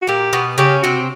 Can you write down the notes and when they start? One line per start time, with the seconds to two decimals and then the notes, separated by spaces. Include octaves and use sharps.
0.02 F#4
0.07 A#2 A#3 G4
0.33 B2 B3
0.58 C#3 C#4 G4
0.83 C3 C4 F#4